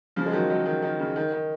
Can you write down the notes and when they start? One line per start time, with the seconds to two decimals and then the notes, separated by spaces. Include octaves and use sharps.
0.16 C#3 F3
0.26 G#3
0.32 D#3 F#3
0.50 D#3 F#3
0.66 D#3
0.82 D#3
0.99 C#3
1.16 D#3
1.32 D#3